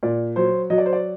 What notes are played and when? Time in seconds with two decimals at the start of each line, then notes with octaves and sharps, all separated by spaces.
0.03 A#2 D5
0.36 F#3 C5
0.70 F#3 D#5
0.78 D5
0.86 C5
0.93 D5